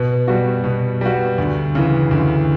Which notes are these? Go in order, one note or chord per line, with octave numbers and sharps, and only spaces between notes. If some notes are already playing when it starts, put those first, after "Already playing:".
Already playing: B2
G3 B3 F#4
B2
G3 B3 F#4
D2
C#3 E3
D2